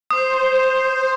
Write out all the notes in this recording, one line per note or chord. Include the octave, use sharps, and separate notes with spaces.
C5 D#6